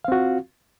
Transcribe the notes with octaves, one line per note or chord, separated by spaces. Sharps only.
C4 F4 F#4 F5